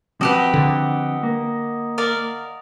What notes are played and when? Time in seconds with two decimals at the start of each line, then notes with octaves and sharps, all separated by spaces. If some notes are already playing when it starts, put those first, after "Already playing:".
0.21 F3 C4 F#4 G4 B4 D#5 F#5
0.54 D3
1.23 A#3
1.98 A#4 D5 F5